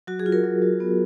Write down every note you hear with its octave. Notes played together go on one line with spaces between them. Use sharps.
F#3 F#4
G#4
F4
A#4
F#3
F#3
B3